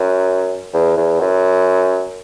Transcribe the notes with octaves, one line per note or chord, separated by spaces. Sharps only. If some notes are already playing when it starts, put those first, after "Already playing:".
Already playing: F#2
E2
E2
F#2